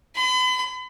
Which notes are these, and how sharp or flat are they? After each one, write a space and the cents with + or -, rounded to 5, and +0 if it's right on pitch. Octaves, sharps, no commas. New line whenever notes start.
B5 +40